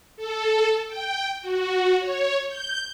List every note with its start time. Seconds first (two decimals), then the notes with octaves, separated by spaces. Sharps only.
0.16 A4
0.88 G5
1.41 F#4
2.00 C#5
2.48 G6